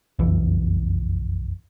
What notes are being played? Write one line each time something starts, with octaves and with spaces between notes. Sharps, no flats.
F#1 B1 F2 E3